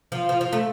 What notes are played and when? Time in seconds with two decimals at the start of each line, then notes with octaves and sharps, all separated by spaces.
0.12 F3
0.29 F3
0.41 F3
0.53 A3